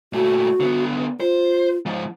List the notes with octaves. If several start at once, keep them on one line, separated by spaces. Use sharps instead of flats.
A#2 A3 F#4
D3 B3
F4 C5
G#2 F3